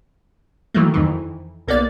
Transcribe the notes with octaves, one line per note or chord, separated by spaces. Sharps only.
D#3 E3 F#3 A3 A#3
F2 D#3 E3
B1 A#3 B3 D5 A6